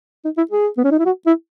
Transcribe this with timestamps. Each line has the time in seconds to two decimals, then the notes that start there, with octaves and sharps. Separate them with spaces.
0.24 D#4
0.37 E4
0.51 G#4
0.77 B3
0.84 C#4
0.91 D#4
0.99 E4
1.05 F#4
1.26 E4